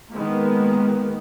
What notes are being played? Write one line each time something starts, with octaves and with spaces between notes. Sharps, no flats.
D#3 G#3 A#3 B3